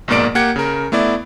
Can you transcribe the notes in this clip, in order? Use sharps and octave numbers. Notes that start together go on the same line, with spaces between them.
A#1 G#2 B2 A#3 D5 D7
A#3 G4 F#5 G5 G#6 C#7
C#3 A#4
A3 B3 E4 D5